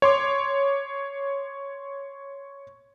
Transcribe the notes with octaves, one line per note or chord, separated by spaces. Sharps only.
C#5 C6 D6